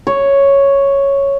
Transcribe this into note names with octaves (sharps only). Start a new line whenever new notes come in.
C#5